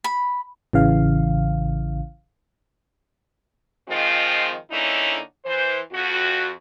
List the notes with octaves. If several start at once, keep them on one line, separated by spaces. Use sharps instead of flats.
B5
A1 C#3 E3 F5
D#3 F3 G#3 C4 F4
D3 A#3 C#4 D#4 E4
E3 C5
F2 F#4